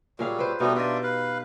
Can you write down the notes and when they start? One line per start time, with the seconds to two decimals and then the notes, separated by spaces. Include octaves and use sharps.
0.19 A#2 F#3 G3 G#4 F5
0.39 B4 C5
0.60 B2 G3 A3 B3 D#4 F#4
0.76 D4 F4 G4 D#5 E5
1.03 B4 F5